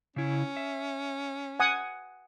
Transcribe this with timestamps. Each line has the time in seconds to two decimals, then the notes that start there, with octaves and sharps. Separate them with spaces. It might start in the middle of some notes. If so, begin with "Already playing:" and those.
0.16 C#3 C#4 E4
0.57 E5
1.60 F#5 G#5 D#6